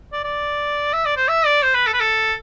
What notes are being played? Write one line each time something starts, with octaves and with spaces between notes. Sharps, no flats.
D5
D5
E5
D5
C5
E5
D5
C5
B4
A4
B4
A4